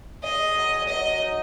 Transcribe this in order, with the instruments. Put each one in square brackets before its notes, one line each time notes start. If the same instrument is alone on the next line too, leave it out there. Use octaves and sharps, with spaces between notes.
[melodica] G#4 [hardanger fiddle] D#5
[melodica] F#3
[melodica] F#3 [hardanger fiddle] D#5
[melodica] D#4